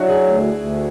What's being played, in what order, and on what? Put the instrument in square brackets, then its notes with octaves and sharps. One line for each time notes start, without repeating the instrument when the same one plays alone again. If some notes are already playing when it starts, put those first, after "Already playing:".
Already playing: [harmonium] F#3 [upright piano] D4 E4 F#4
[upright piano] G#4
[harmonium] D2
D2